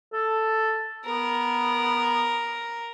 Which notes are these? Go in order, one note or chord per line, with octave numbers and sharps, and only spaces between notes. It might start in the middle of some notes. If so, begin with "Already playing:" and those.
A4
B3 A#4